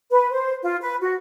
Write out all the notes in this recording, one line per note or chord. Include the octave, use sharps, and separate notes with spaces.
B4
C5
F4
B4
F#4